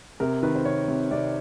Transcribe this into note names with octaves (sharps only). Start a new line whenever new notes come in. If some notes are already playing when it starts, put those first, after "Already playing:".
C3 A#4
D#3 B4
C5
C3 C#5
C3
C3 D5